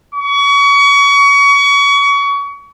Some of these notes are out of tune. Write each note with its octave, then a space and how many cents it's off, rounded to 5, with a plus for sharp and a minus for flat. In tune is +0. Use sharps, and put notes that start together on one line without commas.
C#6 +30